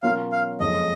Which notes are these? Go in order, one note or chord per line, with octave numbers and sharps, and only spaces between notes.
B2 F#3 C#4 F4 A#4 F5
F5
F#1 F2 C#3 G#3 C#4 D#5